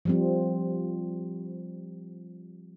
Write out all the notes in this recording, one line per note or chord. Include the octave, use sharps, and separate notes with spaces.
F3 G3 C4